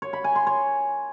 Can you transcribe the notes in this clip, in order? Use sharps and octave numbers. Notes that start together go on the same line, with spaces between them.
C#5
B5
G#5
C6
C#5